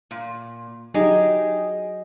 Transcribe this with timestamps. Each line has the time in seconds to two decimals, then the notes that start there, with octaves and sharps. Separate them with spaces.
0.11 A#2
0.94 F#3 D#4 G4 G#4 D#5